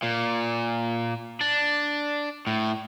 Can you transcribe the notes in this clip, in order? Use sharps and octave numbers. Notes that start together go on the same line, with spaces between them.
A#2
D4
A2